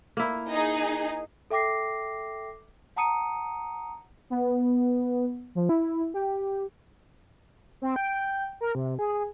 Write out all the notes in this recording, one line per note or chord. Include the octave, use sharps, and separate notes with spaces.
A#3 E4
D#4 G#4
A4 E5 G5 D6 A#6 C7
F#5 A5 A#5 D#6 C#7 D#7
B3
F3
E4
G4
C4
G5
A#4
C3
G#4